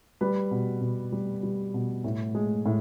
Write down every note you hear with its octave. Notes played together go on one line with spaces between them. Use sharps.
G3 B4
B2
B2
G3
G3
B2
A2
G#3
A2